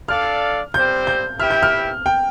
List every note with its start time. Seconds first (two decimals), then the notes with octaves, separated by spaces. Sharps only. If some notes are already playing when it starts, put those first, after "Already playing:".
0.08 D4 A4 D5 F5 F6
0.74 G3 C4 G4 C5 G6
1.07 G6
1.39 E4 G4 B4 E5 G5 F6
1.50 G6
1.63 F6
2.06 G5